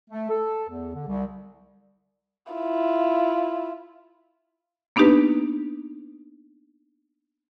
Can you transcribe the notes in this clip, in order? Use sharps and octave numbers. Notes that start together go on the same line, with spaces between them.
A3
A4
E2
D3
C2
E4 F4
A#3 B3 D4 D#4 G4 B4